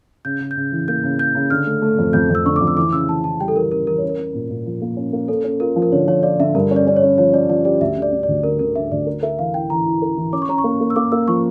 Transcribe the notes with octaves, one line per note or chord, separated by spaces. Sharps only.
C#3 G6
C#3
G6
C#3
E3
A#3 G6
C#3
C#3 G6
C#3
D3 F6
A3
A3
F2
F2 G6
F2
E6
D3 C#6
D6
F2
E6
E3 D6
C#3 E6
E3 A5
E3 A5
G3 G5
A4
E3 A#4
C#3 A#4
E3 A#4
C#4 C#5
A#4
C#4
A#2
A#2
F3
A#3
C#4
A#3
C#4 A4
C#4
F4 A#4
F3
A#4
D3 C#5
F3 C#5
F4 D5
D3 E5
G2 A#4
C#4
D5
C#4 D5
C#5
C#4
F3 C#5
C#4 D5
F3 D5
G4 D5
D2 E5
D3
D5
D3
D5
D2
D3 A#4
D3 A#4
D3 E5
D2 D5
A#4
A#4 E5
E3 F5
E4 G5
E3 A#5
E4
A#4
E3
C#4 D6
C#6
C#4 A#5
C#6
A#3
A#3
E6
A#3 D6
A#3 E6
F3 C#6